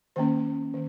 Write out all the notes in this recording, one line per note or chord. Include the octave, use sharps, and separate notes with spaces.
D#3 A#3 C#4 C5
D#3